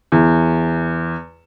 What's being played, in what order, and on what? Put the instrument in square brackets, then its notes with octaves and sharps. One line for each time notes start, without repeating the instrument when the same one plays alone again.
[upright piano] E2